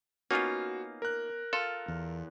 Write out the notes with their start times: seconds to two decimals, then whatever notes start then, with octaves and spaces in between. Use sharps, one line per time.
0.31 A#3 B3 C#4 D#4 F4 F#4
1.02 A#4 F#6
1.53 F4 A4
1.88 E2